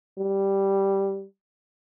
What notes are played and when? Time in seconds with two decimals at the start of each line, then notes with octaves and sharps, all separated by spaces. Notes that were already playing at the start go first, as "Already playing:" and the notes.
0.19 G3